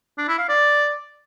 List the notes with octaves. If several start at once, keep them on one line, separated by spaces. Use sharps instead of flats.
D4
E4
F5
D5